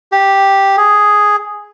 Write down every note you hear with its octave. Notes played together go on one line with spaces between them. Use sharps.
G4
G#4